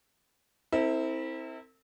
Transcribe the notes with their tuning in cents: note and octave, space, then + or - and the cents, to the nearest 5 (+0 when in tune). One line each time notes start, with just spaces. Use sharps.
C4 +5 E4 -30 A#4 -45